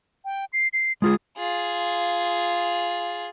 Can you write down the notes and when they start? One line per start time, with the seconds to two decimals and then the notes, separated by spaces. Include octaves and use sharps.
0.25 G5
0.53 C7
0.73 C7
1.02 G#3 F4 G#4 D#6
1.37 F4 G#4